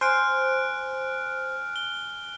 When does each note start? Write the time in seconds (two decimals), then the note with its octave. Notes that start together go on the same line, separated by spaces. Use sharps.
0.01 C5 G#5 F6 F#6 D7
1.76 G7